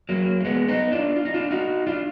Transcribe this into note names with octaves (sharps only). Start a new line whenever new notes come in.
F#3 A#3
A#3
G#3 B3
B3 D#4
D4 F4
F4
D#4
D4 F4
D#4 F#4
D4 F4